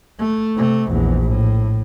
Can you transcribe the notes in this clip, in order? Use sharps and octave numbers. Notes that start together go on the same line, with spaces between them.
A3
C3 A3
A#1 E2
A2